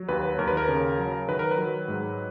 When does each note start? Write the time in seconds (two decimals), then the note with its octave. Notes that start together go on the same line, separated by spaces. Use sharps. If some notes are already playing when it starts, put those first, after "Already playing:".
Already playing: F#3
0.09 D#2 B4
0.39 D#2 A#4
0.48 B4
0.57 A#4
0.68 C#3
0.98 F#3
1.28 D#3 B4
1.39 A#4
1.51 B4
1.58 F#3
1.88 G#2